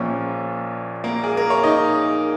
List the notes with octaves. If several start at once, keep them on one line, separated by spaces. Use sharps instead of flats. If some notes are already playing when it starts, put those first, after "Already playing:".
Already playing: A#1 A#2 F3 C#4 C#5
A#3 A#4
G#4
A#4
C#5
D#4 D#5